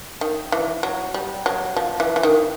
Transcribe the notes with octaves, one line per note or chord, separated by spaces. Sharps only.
D#3
E3
F#3
G3
F#3
F3
E3
E3
D#3